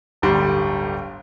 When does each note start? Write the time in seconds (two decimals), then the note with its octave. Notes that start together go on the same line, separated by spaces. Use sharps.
0.22 D1 G1 G3 C6